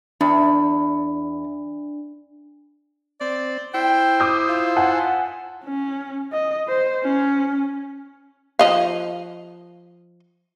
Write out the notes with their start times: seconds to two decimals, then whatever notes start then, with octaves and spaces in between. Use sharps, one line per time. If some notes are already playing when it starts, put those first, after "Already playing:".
0.21 E2 D4
3.21 C4 D5
3.74 E4 C5 G5
4.20 D6 D#6 G6
4.49 F4
4.76 F#5 G#5 A5
5.64 C#4
6.33 D#5
6.68 C5
7.03 C#4
8.59 F3 D#5 F5